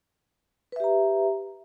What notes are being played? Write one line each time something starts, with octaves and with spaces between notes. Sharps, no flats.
G4 B4 E5 A#5